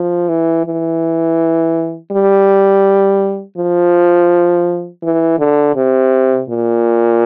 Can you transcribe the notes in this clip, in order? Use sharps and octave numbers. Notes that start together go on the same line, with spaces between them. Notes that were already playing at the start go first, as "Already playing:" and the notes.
Already playing: F3
E3
E3
G3
F3
E3
D3
C3
A#2